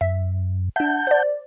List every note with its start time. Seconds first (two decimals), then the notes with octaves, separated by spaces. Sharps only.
0.01 F#2 E5
0.76 D4 E5 F#5 A5 G6
1.07 C5 D5